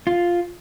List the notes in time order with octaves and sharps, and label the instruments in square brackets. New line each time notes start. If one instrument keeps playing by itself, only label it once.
[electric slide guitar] F4